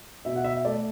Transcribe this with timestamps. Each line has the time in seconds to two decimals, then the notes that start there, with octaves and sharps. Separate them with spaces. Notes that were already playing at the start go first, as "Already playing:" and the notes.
0.25 B2 E5
0.36 F#5
0.44 E5
0.65 A3 D5